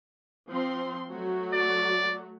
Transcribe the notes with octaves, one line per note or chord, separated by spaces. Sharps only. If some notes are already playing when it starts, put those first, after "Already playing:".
F3 C4 C6
F#3 A3 F#4
D5